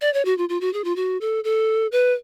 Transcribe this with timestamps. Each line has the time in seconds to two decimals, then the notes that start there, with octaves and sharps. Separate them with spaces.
0.01 D5
0.14 C#5
0.25 F#4
0.38 F4
0.49 F4
0.61 F#4
0.73 G#4
0.84 F4
0.96 F#4
1.21 A4
1.44 A4
1.92 B4